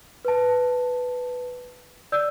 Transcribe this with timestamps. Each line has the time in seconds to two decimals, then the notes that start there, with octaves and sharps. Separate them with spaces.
0.25 B4 A5
2.12 D5 E6 G6